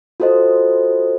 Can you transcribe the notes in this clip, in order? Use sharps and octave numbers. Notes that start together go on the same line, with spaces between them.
F4 F#4 A4 C5 D#5